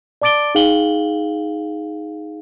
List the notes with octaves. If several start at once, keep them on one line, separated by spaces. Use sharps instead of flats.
D5 A5 D6 A6 D7 G7
D#4 G#4 F5 G5 F#7 G7